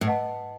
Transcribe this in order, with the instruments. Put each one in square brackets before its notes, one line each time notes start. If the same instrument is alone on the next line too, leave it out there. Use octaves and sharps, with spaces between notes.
[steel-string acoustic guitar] A2
[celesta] B4 D#5 F#5 A5